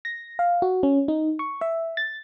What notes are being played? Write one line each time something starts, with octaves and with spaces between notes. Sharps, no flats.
A#6
F5
F#4
C#4
D#4
C#6
E5
A6